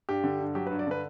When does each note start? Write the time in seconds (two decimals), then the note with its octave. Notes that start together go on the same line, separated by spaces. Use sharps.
0.09 G2 G4
0.24 D3
0.40 G2
0.55 F#3 G4
0.67 B4
0.71 G2
0.79 D5
0.87 D3 B4